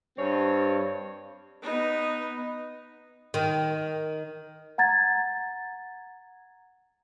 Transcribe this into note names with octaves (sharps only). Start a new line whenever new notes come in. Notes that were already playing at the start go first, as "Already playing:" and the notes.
G2 C4 C#5
B3 D#4
D#3
F#5 A#5 G#6 A6